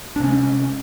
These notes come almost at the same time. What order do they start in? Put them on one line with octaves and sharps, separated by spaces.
D4 C3 C#4 G#3